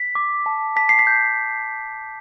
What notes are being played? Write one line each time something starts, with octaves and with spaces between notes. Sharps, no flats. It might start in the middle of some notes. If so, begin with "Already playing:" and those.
Already playing: B6
D6
A5
A5 B6
C7
B6
G6